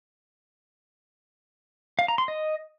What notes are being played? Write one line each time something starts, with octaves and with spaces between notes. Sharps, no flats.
F5
A#5
C6
D#5